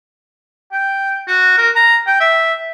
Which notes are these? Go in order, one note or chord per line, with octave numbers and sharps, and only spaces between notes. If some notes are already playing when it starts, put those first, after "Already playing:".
G5
F#4
A#4
A#5
G5
E5